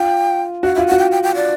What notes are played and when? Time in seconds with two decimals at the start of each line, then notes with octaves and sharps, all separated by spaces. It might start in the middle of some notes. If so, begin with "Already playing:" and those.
Already playing: F4 G5
0.63 F#4 F5
0.75 F4 E5
0.87 F#5
0.92 F#4
0.99 G5
1.12 G5
1.23 G5
1.35 D5